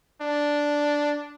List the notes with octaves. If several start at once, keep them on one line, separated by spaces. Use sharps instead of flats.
D4